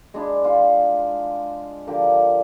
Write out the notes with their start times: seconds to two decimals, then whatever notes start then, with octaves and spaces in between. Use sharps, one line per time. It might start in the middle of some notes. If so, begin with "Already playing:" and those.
0.14 G#3 D4 E4
0.44 F4
1.87 D3 F3 G4 A#4